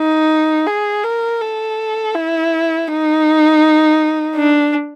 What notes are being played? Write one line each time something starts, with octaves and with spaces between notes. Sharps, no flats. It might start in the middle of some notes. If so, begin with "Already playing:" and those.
Already playing: D#4
G#4
A#4
A4
E4
D#4
D4